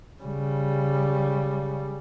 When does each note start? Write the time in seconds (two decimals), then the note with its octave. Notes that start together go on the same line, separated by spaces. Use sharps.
0.22 C#3 G3